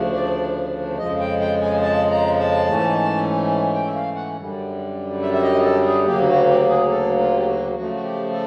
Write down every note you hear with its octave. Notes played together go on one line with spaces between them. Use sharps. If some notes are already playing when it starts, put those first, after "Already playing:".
Already playing: D2 C#3 F3 A3 D4
D5
F2 C#3 F3 G#3 D#5
G5
G5
G#5
A5
A#5
A5
G#2 E3 A3 C#4
G5
E5
F5
F#5
F#2 D3 G3
E5
E5
D#5
G#4
A4
G#4
D2 C#3 F#3 A#3 G4
F#4
G4
G#4
A4
F4
G4
F#4
C#3 F3 A3 F#4
F#4
G4
A4